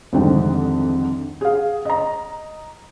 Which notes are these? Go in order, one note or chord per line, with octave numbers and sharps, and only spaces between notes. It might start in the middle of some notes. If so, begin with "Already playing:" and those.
C2 F2 G#2 D3 D#3 C4
G#4 F5
D#5 A#5